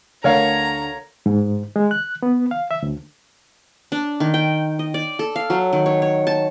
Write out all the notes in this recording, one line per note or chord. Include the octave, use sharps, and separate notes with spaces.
D2 D3 A#4 C#5 F5 A#5
G#2
G#3
F#6
B3
F5
E5
D2
D4
D#3
G5
D#5
D5
A4
F5
F#3
D#3
C#5
C#5
A5